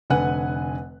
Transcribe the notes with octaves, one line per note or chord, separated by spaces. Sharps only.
F1 D3 B4 F#5 G#5 F#6